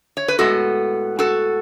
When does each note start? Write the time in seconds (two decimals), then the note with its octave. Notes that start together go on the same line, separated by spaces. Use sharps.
0.17 C#5
0.28 B4
0.39 A2 G#3 B3 F#4 A4
1.19 F#4 A4